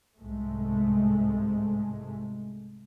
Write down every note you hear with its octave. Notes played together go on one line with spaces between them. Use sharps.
C2 G#2 G#3 A3